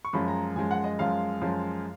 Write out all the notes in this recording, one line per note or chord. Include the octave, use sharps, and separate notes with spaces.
C#6
F#2 F3 G#3 B5
A#5
F#2 F3 G#3 G#5
F#5
D#5
F#2 F3 G#3 F5
F#2 F3 G#3